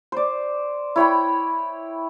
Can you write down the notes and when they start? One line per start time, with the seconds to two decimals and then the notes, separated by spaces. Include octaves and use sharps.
0.12 C5 D5
0.96 E4 C#5 G5 B5